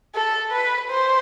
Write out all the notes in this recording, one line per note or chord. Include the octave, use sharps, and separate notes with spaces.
A4
B4
C5